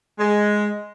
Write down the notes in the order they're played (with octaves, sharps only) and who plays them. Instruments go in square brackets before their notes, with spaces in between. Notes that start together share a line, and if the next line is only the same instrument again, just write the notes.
[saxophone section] G#3